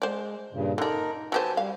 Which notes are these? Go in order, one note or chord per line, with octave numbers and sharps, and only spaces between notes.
G#3 C5 D5
G2 A#2 C#3
D3 D4 D#4 A#4
F#3 G4 B4 C5 G#5 A5
G3 F5